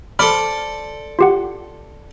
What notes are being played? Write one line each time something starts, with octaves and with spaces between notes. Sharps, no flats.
A4 C5 D5 B5 F6
F4 G4 F#5